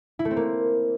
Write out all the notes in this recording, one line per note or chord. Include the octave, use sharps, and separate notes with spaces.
E4
A3
C4
A#3